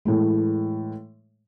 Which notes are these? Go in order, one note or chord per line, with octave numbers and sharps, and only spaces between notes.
A2 E3 G#3